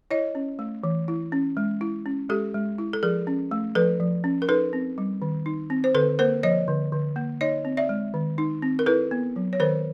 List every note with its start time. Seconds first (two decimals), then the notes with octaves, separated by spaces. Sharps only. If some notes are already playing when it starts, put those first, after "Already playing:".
0.11 E4 C#5 D#5
0.35 C#4
0.59 A3
0.84 E3
1.08 E4
1.32 C#4
1.57 G#3
1.81 E4
2.06 C#4
2.29 G#3 G4 A4
2.54 G#3
2.78 E4
2.93 A4
3.03 F3 G#4 A#4
3.27 C#4
3.51 A3
3.75 F3 A4 B4
4.00 F3
4.24 C#4
4.42 A#4
4.49 D#4 A4 B4
4.73 C4
4.98 G3
5.22 D#3
5.46 D#4
5.70 C4
5.84 C5
5.95 D3 A4 B4
6.19 A#3 A#4 C5
6.43 F3 C#5 D#5
6.68 D3
6.92 D3
7.16 A#3
7.41 D#4 C#5 D#5
7.65 C4
7.77 D5 E5
7.89 G#3
8.14 D#3
8.38 D#4
8.62 C4
8.79 A#4
8.86 E4 A4 B4
9.11 B3
9.36 F#3
9.53 C#5
9.60 D#3 A#4 C5